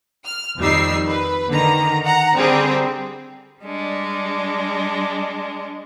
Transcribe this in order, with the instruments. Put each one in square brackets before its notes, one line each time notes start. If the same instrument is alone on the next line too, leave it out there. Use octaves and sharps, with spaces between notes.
[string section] F6
F2 D#3 G3 D#4 E6 C7
B4
D3 D#3 A#5
F#5 A#5
D3 G3 C4 G#4 A#4
[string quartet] G3 G#3 D4